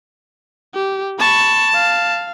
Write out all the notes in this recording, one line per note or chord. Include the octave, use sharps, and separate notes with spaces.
G4
A5 B5 C#6
F5